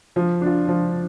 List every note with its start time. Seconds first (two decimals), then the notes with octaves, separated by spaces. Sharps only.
0.16 F3
0.41 D4 F4
0.68 F3